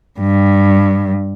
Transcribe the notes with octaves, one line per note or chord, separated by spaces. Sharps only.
G2